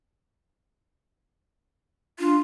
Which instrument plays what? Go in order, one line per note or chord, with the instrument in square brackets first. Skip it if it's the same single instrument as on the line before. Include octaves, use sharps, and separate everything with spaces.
[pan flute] D4 [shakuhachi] F4